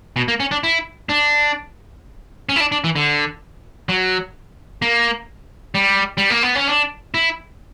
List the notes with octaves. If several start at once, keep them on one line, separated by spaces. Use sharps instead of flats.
B2
A#3
C#4
D4
E4
D4
C#4
E4
D4
D4
E3
D3
F#3
A#3
G3
G3
A#3
B3
C#4
D4
E4